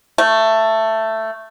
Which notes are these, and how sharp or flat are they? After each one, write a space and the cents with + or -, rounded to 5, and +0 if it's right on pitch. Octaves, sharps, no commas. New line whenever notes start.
A3 +10